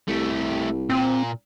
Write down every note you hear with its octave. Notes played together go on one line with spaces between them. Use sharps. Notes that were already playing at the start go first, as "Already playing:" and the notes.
C2 A3 G4
A#2 C4